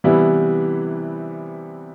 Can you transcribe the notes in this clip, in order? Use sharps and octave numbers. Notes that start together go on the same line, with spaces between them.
C3 E3 G3 B3 E4